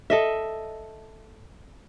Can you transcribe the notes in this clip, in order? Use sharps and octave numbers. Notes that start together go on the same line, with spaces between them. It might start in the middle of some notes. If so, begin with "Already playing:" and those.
A4 D#5 E5